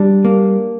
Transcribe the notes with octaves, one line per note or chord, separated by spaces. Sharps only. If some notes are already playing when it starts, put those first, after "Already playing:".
Already playing: G3 D4
A#3